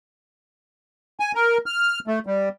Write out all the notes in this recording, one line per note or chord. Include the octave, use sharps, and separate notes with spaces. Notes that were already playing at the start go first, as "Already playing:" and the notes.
G#5
A#4
F6
A3
G3